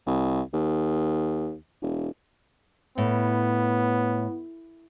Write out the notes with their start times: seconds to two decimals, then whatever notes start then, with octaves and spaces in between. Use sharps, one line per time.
0.07 C2
0.54 D#2
1.81 E1
2.98 A2 B3